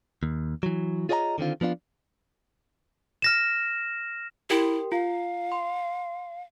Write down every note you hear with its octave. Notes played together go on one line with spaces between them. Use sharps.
D#2
E3 F#3
F4 G#4 C#5 D#5 G5 A#5
D3 D#3 C4 F4
F3 B3 D4 F4
F6 A#6 E7
E4 G4 A#4 G5
F4 F5
C6